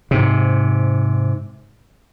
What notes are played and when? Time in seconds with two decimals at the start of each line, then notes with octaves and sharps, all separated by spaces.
0.11 G#2 C3